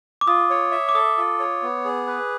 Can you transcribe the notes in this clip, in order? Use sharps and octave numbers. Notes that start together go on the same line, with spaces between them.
D6
F4 D#6
C#5
E5
D6
A4 D#6
F4
C#5
B3
G#4
B4